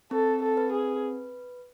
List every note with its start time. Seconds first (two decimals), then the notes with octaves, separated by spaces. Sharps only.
0.11 C4 A4
0.42 A4
0.57 B4
0.72 G#4